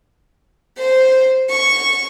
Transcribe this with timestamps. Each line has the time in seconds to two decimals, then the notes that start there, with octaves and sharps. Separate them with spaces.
0.77 C5
1.50 C#6